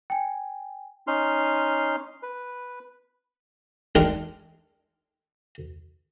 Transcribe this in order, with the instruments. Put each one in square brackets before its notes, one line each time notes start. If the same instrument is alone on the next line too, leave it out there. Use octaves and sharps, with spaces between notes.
[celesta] G5 G#5
[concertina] C#4 D#4 C6 F6
B4
[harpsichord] G#3 D4 D#4 G4 A#4